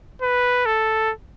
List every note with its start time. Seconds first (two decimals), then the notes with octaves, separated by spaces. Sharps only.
0.22 B4
0.66 A4